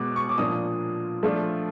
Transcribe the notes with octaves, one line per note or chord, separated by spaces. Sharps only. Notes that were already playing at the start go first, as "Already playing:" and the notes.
Already playing: B2 G#3 B3 D6
C#6
D6
A#2 F3 A#3 D4 F4 D#6
F3 A3 D4 F4